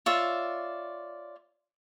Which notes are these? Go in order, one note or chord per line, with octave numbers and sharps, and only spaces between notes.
F4 C#5 D5 E5